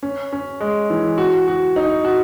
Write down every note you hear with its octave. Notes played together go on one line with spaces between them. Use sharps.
C#4
C#4
G#3
E3
F#4
F#4
D#4
F#4